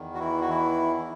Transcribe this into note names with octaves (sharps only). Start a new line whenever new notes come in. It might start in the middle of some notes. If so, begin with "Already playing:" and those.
Already playing: E2 D#3
F#4
E3 E4
F#4
E3 E4
E4